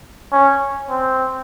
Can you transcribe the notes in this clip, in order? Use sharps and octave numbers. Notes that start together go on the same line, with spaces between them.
C#4
C4